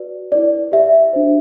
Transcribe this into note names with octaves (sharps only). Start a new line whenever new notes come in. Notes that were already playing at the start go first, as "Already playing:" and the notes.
Already playing: F#4 B4 D5
E4 B4 D5
G4 D5 E5
D4 F#4 C5